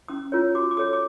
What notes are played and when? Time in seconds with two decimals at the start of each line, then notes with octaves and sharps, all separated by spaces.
0.08 C#4 D#6
0.32 F4 A#4 C#5
0.55 F#4 D6
0.71 D6
0.77 A4 C#5 D#6
0.93 D6